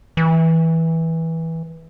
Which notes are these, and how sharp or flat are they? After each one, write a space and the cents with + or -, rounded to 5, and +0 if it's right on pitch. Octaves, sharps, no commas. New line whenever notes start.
E3 -15